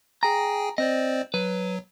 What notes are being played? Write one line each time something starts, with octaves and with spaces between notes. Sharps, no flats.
G#4 G5 G#5 A#5
C4 C5 D5 D#5
F#3 B4